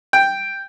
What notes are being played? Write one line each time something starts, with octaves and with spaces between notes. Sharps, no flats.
G5